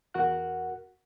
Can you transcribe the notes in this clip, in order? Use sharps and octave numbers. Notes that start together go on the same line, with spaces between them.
E2 F#4 A#4 F#5 F#6